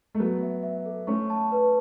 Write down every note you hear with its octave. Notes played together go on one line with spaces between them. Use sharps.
A3
F#3 B3 A4
E5
E5
A4
A3 C#4 C#6
A5
B4